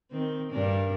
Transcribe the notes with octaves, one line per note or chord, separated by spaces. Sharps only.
D#3 C4
G2 D4 A#4